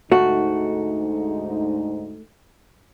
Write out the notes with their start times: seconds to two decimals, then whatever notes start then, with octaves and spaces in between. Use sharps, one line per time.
0.12 D2 G#2 A3 D#4 F#4